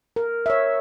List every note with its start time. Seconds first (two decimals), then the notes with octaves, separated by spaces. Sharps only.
0.16 A#4
0.46 C#5 E5